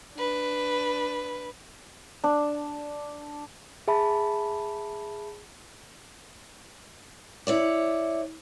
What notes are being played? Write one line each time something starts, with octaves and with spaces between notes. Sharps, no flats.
D4 B4
D4
G#4 E5 A5 B5
E4 C#5 D5